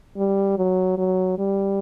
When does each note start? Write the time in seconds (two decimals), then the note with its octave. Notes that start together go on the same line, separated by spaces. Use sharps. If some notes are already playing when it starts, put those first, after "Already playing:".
0.17 G3
0.58 F#3
0.98 F#3
1.39 G3